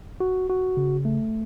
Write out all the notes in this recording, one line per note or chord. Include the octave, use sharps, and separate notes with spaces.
F#4
F#4
C#3
A3